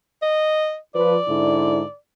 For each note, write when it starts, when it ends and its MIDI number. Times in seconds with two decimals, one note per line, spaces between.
0.22 0.77 75
0.95 1.18 53
0.95 1.18 71
0.95 1.95 74
1.28 1.82 44
1.28 1.82 50
1.28 1.82 64